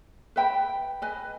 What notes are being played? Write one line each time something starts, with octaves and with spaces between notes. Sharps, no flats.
B4 E5 G5 B5
B4 D#5 G#5